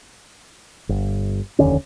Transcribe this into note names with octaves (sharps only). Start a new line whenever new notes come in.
G1
F1 D#2 D3 C#4